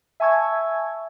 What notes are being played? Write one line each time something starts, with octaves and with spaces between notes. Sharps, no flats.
E5 G#5 A5 C#6 E6 G#6